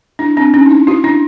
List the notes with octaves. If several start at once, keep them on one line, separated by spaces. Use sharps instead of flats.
D4 E4
C4 D4
C#4 D#4
D#4
D4 E4
E4 F#4
D4 E4